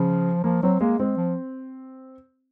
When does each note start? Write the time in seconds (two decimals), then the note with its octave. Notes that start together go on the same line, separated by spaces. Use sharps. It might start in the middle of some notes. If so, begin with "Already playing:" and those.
Already playing: C#3 F3
0.44 F3 A#3
0.63 F#3 C4
0.81 G#3 A#3
1.00 G#3 C4
1.17 F3